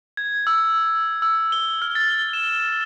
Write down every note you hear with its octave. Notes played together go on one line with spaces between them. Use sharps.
G#6
E6
E6
G7
F6
A6
E7